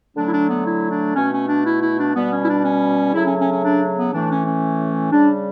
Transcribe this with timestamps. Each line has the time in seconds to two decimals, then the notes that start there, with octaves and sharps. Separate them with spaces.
0.15 D3 F#3 A3 D4
0.27 E4
0.32 D4
0.48 B3
0.65 E4
0.89 D4
1.15 B2 A3 C#4
1.30 C#4
1.47 D4
1.64 E4
1.80 E4
1.97 D4
2.14 B2 G3 B3
2.30 C#4
2.41 E4
2.47 D4
2.63 C#4
3.12 C#3 F#3 A3 E4
3.25 C#4
3.38 C#4
3.50 C#4
3.62 D4
3.96 B3
4.11 A2 E3 A3 D4
4.29 C#4
4.44 C#4
5.11 C#3 G3 D4